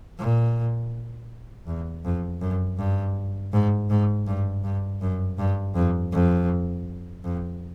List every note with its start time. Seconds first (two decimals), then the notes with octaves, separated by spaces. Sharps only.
0.18 A#2
1.67 E2
2.04 F2
2.41 F#2
2.78 G2
3.53 G#2
3.90 G#2
4.27 G2
4.64 G2
5.01 F#2
5.38 G2
5.76 F2
6.13 F2
7.24 F2